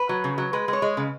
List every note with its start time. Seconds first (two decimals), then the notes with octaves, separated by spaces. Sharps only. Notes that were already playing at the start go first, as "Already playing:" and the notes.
Already playing: B4
0.09 F#3
0.24 C#3
0.38 F#3
0.53 G#3 B4
0.68 G#3
0.73 C#5
0.82 G#3
0.97 C#3